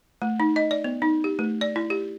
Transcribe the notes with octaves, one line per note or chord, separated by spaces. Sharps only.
A3
D#4
D#5
D5
B3
D#4
G4
A3
D5
E4
G4